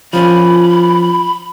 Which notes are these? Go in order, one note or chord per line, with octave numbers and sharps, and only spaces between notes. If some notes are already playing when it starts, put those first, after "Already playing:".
F3 C#4 B5